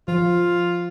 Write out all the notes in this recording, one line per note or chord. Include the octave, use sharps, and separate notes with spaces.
F3 F4